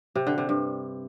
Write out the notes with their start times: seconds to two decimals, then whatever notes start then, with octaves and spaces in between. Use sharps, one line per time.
0.15 C3
0.27 D3
0.38 C3
0.49 G2